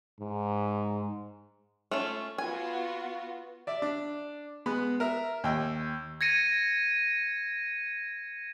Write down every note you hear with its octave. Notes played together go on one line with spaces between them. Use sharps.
G#2
A3 C#4 F4
B3 F4 F#4 G#5
D5 E5
D4
G#3 B3 B5
A#4 E5
D#2 G5 E6
G#6 A#6 C#7 D#7